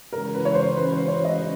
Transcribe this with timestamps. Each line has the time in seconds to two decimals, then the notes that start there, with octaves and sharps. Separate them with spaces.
0.12 C#3 E3 G#3 C#4 F#4 A#4
0.34 B4
0.45 C#5
0.54 C5
0.76 B4
0.92 C5
1.08 C#5
1.25 D#5